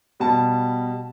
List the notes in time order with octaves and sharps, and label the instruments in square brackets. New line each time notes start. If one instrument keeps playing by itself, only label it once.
[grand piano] B2 G3 A5